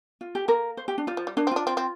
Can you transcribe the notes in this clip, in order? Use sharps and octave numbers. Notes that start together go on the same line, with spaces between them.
F4
G4
A#3 A#4
C5
G4
D4
G3 F4
F3
G3
A#3 D4
C4
D4 F4
C4
C4